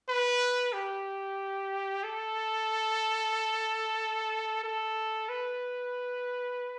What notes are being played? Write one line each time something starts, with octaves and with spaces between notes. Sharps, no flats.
B4
G4
A4
A4
B4